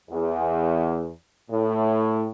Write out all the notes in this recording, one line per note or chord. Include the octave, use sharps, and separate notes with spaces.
E2
A2